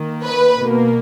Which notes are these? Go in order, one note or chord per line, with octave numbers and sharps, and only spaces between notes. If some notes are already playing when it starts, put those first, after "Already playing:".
Already playing: D#3 A#3
B4
B2 A#3